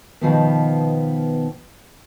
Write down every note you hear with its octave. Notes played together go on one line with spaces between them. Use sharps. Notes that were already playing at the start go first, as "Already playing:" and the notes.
B2 D#3 F3 B3